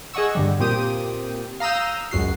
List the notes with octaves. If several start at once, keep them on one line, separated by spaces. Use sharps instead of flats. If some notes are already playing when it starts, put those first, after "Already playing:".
G#4 D#5 F#5 C#6 E6
G2 D3 G3
A#2 C4 G4 D#6
F5 A#5 D#6 E6 G6
C#2 F#2 F#4 C7